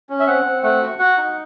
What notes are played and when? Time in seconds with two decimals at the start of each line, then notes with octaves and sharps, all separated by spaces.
0.10 C#4
0.20 E5
0.27 C4 F#5
0.46 C4
0.63 A3 F#5
0.82 F#4
0.99 F#4 F#5
1.18 D#4